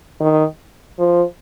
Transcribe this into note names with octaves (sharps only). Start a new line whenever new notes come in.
D#3
F3